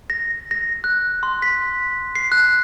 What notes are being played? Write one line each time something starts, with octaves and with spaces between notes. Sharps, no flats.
A#6
A#6
F#6
C6
B6
C7
F#6